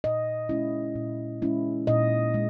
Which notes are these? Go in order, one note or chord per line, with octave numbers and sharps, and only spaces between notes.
A#2 D#5
G#3 C#4 E4
A#2
G#3 C#4 E4
A#2 D#5
G#3